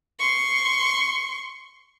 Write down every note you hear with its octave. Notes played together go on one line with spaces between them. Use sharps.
C6 C#6